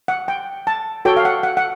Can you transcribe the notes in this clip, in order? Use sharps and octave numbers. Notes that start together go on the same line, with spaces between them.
F#5
G5
A5
F#4 A4 C#5 G5
F5
F#5
F#5
F#5